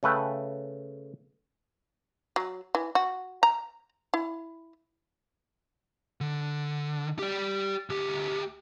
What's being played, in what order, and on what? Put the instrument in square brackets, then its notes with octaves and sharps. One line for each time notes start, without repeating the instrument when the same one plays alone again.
[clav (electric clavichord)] C#3 A3 B4 G5
[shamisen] F#3
E3
F#4
A#5
E4
[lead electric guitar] D3
G4 D5
D2 G4